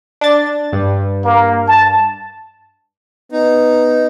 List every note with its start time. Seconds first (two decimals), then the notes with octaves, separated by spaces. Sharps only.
0.21 D4 A6
0.73 G2
1.24 A#3
1.68 A5
3.32 B3 D#4